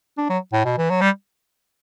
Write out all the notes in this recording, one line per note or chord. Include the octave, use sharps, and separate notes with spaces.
D4
F#3
A2
B2
E3
F#3
G3